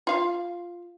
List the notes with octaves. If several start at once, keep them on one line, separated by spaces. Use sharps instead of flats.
F4 F5